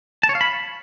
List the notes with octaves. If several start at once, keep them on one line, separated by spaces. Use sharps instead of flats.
A5
C#5
F5
B5